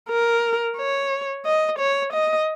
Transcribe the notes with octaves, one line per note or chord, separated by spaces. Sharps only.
A#4
C#5
D#5
C#5
D#5